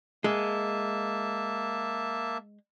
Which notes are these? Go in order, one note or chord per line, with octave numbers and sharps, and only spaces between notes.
G#3 A#3 E5 A5